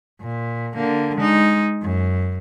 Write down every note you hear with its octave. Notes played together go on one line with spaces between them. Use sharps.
A#2
D3 A#3
G#3 D#4
F#2